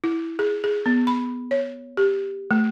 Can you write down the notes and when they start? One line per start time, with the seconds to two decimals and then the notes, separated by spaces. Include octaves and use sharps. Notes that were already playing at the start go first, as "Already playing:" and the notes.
0.04 E4
0.39 G#4
0.64 G#4
0.86 B3
1.07 B5
1.51 C#5
1.97 G4
2.51 A3